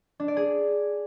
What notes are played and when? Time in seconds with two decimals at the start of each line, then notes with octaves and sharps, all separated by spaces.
0.20 D4
0.28 D5
0.37 G#4